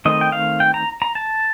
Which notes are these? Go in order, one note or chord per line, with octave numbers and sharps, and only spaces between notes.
D#3 A3 C4 D#5
G5
F5
G5
A#5
A#5
A5